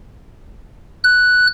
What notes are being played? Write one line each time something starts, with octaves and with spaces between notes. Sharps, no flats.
F#6